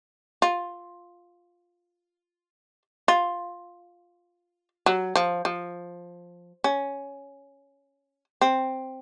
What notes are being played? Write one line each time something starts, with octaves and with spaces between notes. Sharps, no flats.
F4
F4
F#3
F3
F3
C#4
C4